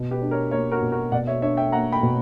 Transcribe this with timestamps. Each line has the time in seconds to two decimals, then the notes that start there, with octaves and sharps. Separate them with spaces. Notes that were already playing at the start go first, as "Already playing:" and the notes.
Already playing: B2
0.11 G4 B4
0.22 D4
0.31 A#4 C#5
0.51 A#3 A#4 C#5
0.71 F#4 A#4
0.82 B2
0.92 F#4 A#4
1.12 B2 D5 F#5
1.27 C#5 E5
1.42 D4 C#5 E5
1.57 E5 G5
1.72 A#3 F#5 A#5
1.92 G5 B5
2.03 B2